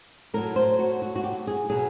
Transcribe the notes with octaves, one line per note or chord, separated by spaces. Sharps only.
A2 F#3 A#4
C5
F#4
F#4
F#4
G4
G#4
B2 F#3 G#4